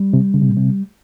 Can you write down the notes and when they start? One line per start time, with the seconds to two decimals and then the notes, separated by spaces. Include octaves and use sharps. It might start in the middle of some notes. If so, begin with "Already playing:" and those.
Already playing: G3
0.13 C3
0.34 C#3
0.42 C3
0.49 A#2
0.57 C3